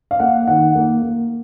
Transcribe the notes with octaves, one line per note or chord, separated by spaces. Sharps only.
F5
A#3 F#5
D#3 F#5
A#3
A#3